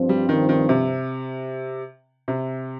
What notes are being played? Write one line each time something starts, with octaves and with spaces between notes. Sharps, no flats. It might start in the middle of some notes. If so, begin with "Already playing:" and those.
Already playing: G2 F3 C4
G3
D#3
D#3
C3
C3